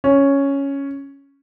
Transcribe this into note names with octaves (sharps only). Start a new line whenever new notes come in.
C#4